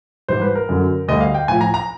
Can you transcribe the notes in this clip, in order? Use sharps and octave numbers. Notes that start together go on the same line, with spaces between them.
G#2 E3 G3 C5
B4
A#4
F#2 D3 F#3
D2 D3 G3 D#5
F5
G5
A2 F3 G#5
A#5
A#5